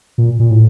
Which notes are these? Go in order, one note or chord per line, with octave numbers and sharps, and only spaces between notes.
A#2
A#2
A2